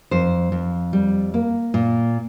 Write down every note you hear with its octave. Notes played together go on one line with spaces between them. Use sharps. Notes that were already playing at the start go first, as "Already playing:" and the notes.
F2 C5
F2
G3
A#3
A#2